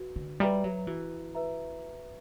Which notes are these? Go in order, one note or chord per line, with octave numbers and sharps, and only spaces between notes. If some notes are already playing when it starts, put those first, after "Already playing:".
Already playing: F#4 B4
D3
G3 B4 E5 A#5
F#3
E3 F#4
B4 E5 A#5